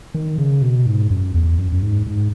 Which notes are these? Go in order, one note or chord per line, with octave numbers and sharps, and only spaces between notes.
D#3
C#3
B2
G#2
F#2
E2
F#2
F#2
G#2
G#2